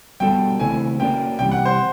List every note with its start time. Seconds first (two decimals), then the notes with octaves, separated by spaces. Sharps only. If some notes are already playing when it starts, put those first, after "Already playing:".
0.20 G3 B3 D4 F#4 A4 G5
0.60 C#3 E3 A3 C4 E4 G#5
1.00 A#3 C#4 F#4 B4 D5 G5
1.39 C3 E3 G3 G5
1.51 F#5
1.65 C5